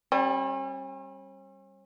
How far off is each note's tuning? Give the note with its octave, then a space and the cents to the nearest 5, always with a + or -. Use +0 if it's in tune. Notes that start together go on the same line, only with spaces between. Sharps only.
G3 +0 C#4 -45